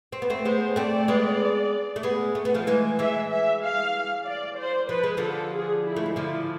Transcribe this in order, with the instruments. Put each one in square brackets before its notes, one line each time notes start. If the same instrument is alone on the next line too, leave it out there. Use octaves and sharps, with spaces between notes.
[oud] C4
B3
A3 C4
[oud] G#3 B3 [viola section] C5
[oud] A3 C4 [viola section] D5
[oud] G#3 B3
A3
G#3 B3
A3
B3
F3 A3
E3 G#3
[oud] E3 G#3 [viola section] E5
[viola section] E5
F5
D5
C5
[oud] F3 [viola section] B4
[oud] G#3
[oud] D3 F3 [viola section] A4
[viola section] G#4
E4
[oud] A3
G#3
[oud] D3 F3 [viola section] E4